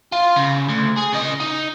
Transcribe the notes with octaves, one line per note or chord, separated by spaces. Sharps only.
F4
C#3
D2
G#4
C#3 D#5
D#4